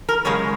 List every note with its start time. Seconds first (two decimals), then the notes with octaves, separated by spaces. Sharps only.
0.09 A#4
0.25 F#2 C#3 G#3 C#5